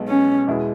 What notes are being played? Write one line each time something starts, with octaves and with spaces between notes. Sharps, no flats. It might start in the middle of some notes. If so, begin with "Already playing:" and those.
Already playing: B1 B2 G#3 B3
C#4
E2 B2 G#3 E4 G#4